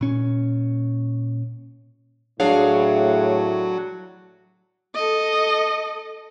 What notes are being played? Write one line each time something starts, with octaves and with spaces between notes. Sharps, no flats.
A#2 C#4
A2 F#3 D4 G#4 C#5 F5
A4 D#5